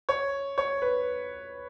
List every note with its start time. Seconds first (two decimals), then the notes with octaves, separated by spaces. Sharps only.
0.09 C#5
0.58 C#5
0.82 B4